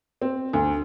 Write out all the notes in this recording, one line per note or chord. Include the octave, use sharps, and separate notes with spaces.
C4
D2